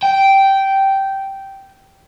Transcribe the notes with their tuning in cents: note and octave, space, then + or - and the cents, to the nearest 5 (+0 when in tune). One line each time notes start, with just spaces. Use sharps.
G5 -10